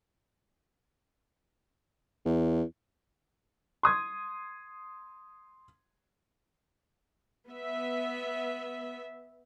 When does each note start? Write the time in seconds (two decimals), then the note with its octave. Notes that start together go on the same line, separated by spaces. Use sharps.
2.25 E2
3.83 C6 D#6 G#6
7.47 B3 E5